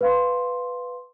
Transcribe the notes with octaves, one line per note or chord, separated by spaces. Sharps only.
B4 F5 C6